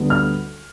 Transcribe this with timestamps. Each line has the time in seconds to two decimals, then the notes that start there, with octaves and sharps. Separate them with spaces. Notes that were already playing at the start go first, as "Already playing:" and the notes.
Already playing: D2 D3 G3 B3
0.10 F6